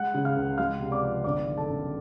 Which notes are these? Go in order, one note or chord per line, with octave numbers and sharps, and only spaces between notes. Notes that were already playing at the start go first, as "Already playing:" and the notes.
Already playing: G#3 F#5 F#6
C#3
F5 F6
C#2
G#3 F5 F6
C3
D5 D6
F3
G1 D5 D6
D#3
A4 A5
F#2